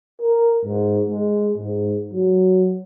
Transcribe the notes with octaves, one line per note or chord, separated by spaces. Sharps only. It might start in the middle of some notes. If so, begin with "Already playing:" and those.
A#4
G#2
G#3
G#2
F#3